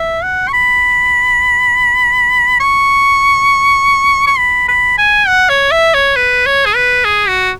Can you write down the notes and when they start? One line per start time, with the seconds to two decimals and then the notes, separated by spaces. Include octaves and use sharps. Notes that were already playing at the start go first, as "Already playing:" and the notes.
Already playing: E5
0.23 F#5
0.49 C#6
0.53 B5
2.60 C#6
4.27 C#6
4.38 B5
4.69 B5
4.98 G#5
5.28 F#5
5.50 C#5
5.72 E5
5.94 C#5
6.16 B4
6.46 C#5
6.66 G#4
6.75 B4
7.05 G#4
7.28 F#4